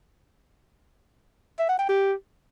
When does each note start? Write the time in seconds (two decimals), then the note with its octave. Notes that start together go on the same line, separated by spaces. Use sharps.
1.59 E5
1.69 F#5
1.79 G5
1.89 G4